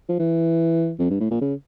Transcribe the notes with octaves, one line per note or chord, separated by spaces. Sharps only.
F3
E3
F2
G2
A2
A#2
C#3